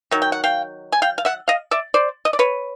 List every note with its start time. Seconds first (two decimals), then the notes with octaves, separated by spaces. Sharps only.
0.11 D#3 F#3
0.22 G5
0.32 F#5
0.44 F5 G5
0.92 G#5
1.02 F5 G5
1.18 F5
1.25 E5 F#5
1.48 D#5 F5
1.71 D5 E5
1.94 C5 D5
2.25 D#5
2.33 D5
2.39 B4 C#5